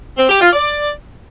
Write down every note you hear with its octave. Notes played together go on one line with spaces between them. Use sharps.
C4
G4
F4
D5